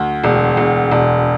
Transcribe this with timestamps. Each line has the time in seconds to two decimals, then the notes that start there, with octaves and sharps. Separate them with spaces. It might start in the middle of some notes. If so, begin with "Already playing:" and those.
Already playing: D2
0.24 E1
0.57 E1
0.91 E1